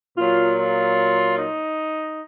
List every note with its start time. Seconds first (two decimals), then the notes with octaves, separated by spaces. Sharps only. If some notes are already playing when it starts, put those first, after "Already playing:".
0.18 A#2 F#3 F4
0.58 F4
1.37 D#4